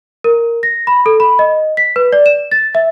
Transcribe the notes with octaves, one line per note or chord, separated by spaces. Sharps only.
A#4
A#6
B5
A4
B5
D#5
B6
B4
D5
E7
A6
E5